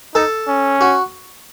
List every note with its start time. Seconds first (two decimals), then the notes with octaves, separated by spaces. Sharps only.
0.15 D#4 A4
0.48 C#4
0.81 F#4